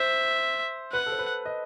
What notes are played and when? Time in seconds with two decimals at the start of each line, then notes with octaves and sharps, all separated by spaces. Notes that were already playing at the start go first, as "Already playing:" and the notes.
Already playing: C5 E5
0.93 B4 F#5
1.06 A4
1.12 C5
1.19 B4
1.46 D#5